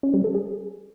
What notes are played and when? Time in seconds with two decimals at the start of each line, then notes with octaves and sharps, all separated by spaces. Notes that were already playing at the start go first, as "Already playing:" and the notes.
0.03 C#4
0.14 G3
0.24 A4
0.35 G#4